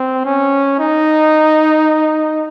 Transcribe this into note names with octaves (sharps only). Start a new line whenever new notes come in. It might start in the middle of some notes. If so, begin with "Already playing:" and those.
Already playing: C4
C#4
D#4